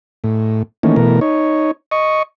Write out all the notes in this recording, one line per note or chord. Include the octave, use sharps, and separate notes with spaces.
A2
D#3 E3 A3 A#3 C#4
B2 E3 A3 A#4
D#4 C#5
D#5 C#6